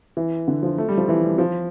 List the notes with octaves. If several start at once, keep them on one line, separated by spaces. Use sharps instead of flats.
E3
D3
F3
A3
G3
F3
E3
G3
F3